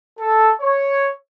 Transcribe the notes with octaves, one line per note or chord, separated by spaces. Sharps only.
A4
C#5